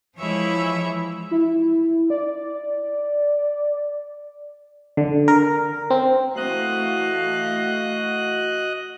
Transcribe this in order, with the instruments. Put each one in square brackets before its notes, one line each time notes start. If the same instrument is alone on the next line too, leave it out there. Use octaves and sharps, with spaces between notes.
[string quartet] E3 F3 G#3 E4 C#5 E5
[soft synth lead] E4
D5
[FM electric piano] D3
A#4
C4
[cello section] E3 A3 F5 [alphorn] F#4 [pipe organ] D#5 F#6